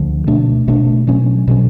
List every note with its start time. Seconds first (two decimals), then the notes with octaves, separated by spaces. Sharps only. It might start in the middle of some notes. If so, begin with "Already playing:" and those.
Already playing: D2 D3 F3
0.27 B2 A3 D4
0.68 B2 A3 D4
1.07 B2 F#3 C#4
1.48 B2 F#3 C#4